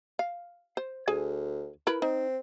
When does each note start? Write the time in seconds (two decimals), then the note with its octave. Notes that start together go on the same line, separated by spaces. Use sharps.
0.19 F5
0.77 C5
1.08 D2 G#4 G#5
1.87 E4 A#4 B4
2.02 C4 D#4